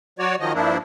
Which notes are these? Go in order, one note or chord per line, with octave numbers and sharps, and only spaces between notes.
F#3 F#4 C#5 D5
D#3 F3 F#3 D#5
G2 F3 A#3 D4 E4